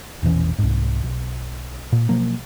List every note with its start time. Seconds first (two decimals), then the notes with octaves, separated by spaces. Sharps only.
0.23 E1 A#1 E3 C#4
0.59 C2 G#2
1.03 B1
1.92 A#2
2.09 B2 F3 F#3 A#3